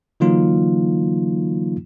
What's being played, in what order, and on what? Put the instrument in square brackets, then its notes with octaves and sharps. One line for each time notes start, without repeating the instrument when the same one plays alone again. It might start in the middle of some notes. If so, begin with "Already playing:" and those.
[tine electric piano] D3 E3 F#3 A#3 D#4 F4